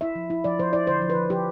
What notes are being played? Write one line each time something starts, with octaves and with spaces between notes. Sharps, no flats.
E4 E5
F3
E4
F3 D5
F3 C5
E4 D5
D3 C5
F3
B4
F3
F3 G4